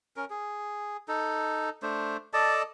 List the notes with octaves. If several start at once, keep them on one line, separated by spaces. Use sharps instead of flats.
C#4 A#4
G#4
D#4 A4
A3 D4 C5
A4 D5 D#5 A5